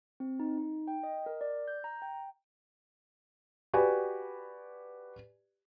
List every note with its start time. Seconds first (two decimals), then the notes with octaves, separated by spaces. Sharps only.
0.20 C4
0.40 D#4
0.58 D#4
0.88 G5
1.03 D#5
1.26 A#4
1.41 D5
1.68 G6
1.84 A#5
2.02 G5
3.74 F#4 G4 B4 D5 G#5